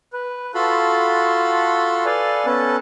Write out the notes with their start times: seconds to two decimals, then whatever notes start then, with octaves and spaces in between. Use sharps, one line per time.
0.13 B4
0.55 F4 F#4 A4 A5 B5 C6
2.05 A4 B4 D5 F5 G#5
2.46 B3 C#4 A4 B4 A5